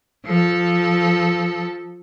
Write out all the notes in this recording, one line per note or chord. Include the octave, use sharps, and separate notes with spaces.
F3 A4